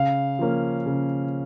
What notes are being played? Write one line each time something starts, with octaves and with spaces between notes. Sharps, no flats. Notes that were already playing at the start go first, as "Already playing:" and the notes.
Already playing: C#3 F5
F3 A#3 C#4
C#3